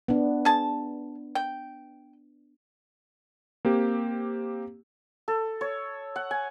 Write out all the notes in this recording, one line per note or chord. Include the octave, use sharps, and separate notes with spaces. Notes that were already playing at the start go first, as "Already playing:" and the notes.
B3 D4
G#4 A5
G5
A#3 C4 G4
A4
C#5
F#5
G#5